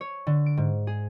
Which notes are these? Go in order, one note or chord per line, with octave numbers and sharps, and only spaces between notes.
C#5
D3
D7
G#2
G#4